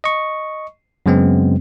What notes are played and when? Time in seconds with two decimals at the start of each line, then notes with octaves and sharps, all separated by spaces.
0.04 D#5 C#6
1.06 F#2 C#3 F#3 G#3 B3 C4